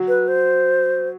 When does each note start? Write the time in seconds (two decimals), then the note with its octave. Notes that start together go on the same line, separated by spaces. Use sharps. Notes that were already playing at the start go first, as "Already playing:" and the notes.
Already playing: F#3
0.08 B4
0.28 C5